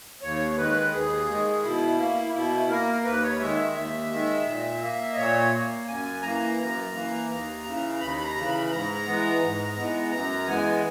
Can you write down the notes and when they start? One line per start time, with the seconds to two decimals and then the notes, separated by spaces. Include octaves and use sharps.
0.21 D#2 C#5
0.52 C#5
0.57 D#3 G#3 B4
0.92 D#2 G#4
1.28 D#3 G#3
1.63 B2 E4
1.98 A#3
2.33 B2 E4
2.70 A#3 A#4
3.05 D#2 B4
3.23 C#5
3.40 D#3 G#3 E5
3.58 E5
3.75 D#2
4.11 D#3 G#3
4.46 A#2
4.81 A#3
5.12 D#5
5.17 A#2 C#5
5.52 A#3
5.87 F#2 G#5
6.22 E3 A#3 A#5
6.58 F#2
6.93 E3 A#3
7.29 D#2
7.64 C#3 E3
8.00 D#2 B5
8.16 B5
8.23 A#5
8.35 C#3 E3
8.46 B5
8.71 G#2 A#5
9.05 E3 G#3 B3
9.41 G#2
9.76 E3 G#3 B3
10.11 F#2 A#5
10.47 E3 G#3 B3 G#5